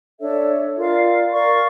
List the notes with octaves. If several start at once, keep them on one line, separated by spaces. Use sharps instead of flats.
D4 A4 C#5 E5
F4 A#4 D5 F5
A#4 D5 F5 C#6